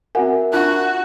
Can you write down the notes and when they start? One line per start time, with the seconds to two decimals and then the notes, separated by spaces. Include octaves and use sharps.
0.15 C4 F#4 A#4 E5 F#5 G#5
0.53 D4 F4 F#4 A5 F#6